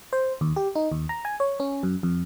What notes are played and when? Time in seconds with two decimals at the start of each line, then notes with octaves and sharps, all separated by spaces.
0.13 C5
0.41 D#2
0.56 G4
0.76 D#4
0.92 D#2
1.09 A#5
1.25 G#5
1.40 C#5
1.60 C#4
1.83 F#2
2.03 F2